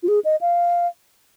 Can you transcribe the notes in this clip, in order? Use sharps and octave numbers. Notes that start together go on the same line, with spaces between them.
F4
G#4
D#5
F5